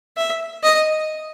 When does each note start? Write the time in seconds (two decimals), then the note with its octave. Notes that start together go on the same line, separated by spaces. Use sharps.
0.17 E5
0.63 D#5